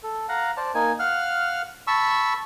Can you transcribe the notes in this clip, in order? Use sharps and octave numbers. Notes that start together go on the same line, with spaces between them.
A4
F5 F#5 A#5
C5 D5 A5
A#3 D#4 G#5
F5 F#5 F6
A5 B5 C#6 E6